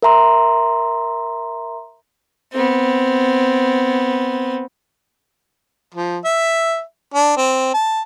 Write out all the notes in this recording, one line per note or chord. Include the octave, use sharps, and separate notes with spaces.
A#4 E5 A#5 C6
B3 C4
F3
E5
D4
C4
A5